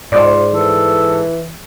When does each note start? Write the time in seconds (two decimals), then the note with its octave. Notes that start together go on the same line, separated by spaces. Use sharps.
0.12 G#2 F4 C5 D5
0.54 E3 A4